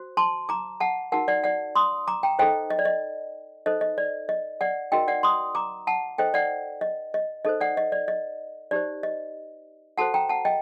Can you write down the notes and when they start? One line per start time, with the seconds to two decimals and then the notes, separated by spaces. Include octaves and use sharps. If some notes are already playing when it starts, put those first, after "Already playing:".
Already playing: F#4 C5
0.17 A5 C6
0.49 A#5 D6
0.80 F#5 A5
1.12 D#4 F#4 A#4 F#5 A5
1.28 D5 F#5
1.44 D5 F#5
1.75 C6 D#6
2.08 A#5 D6
2.23 G5 A#5
2.39 D#4 A4 C5 D#5 G5
2.70 D#5
2.79 D5
2.85 D#5
3.66 D#4 A4 C5 D#5
3.81 D#5
3.98 D5
4.29 D#5
4.61 D5 F#5
4.92 D#4 F#4 A#4 D#5 G5
5.08 D5 F#5
5.23 C6 D#6
5.55 A#5 D6
5.87 F#5 A5
6.18 D#4 A4 C5 D#5 G5
6.34 D5 F#5
6.81 D#5
7.14 D#5
7.45 D#4 A4 C5 D#5
7.60 D5 F#5
7.77 D#5
7.92 D5
8.08 D#5
8.71 D#4 G4 C5 D5
9.03 D#5
9.98 F#4 A4 C5 F#5 A5
10.14 G5 A#5
10.29 F#5 A5
10.45 D#5 G5